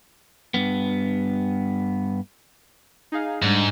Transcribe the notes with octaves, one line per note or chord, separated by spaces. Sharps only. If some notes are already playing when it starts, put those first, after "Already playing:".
G2 B3
D#4 G#4 F5
G#2 G3 G#3 D4